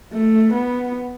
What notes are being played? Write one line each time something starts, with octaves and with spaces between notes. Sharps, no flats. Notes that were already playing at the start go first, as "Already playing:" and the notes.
A3
B3